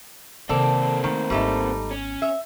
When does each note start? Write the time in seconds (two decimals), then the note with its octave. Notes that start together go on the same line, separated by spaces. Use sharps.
0.49 C3 D#3 A#3 C4 A4 D5
1.04 D#3 A3
1.30 G#1 G3 A3 B3 D#4
1.91 C#4
2.22 E5